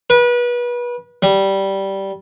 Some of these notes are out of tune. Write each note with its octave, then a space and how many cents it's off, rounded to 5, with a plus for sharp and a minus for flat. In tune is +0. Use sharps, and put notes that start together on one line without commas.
B4 -30
G3 -10